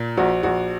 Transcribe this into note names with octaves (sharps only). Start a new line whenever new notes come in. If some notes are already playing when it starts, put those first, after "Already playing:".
Already playing: A#2
A#1 F#4
A#1 F#4